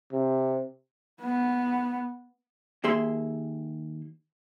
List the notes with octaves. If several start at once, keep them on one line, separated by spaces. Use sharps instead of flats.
C3
B3
D#2 A#3 G#4 E5 C6